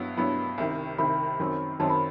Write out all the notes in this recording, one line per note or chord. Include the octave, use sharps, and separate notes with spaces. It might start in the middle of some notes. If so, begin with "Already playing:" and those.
Already playing: G2 F#3 B3 E4
G2 F#3 B3 E4 B5
C2 C3 D#3
C2 C3 D#3 B5
F#2 D#3 F#3 C4
F#2 D#3 F#3 C4 A5
B5